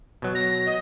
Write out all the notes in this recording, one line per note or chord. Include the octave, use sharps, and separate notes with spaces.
B2 F#3
A#6
D#5